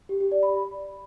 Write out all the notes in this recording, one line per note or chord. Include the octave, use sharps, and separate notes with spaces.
G4
G4
D5
B5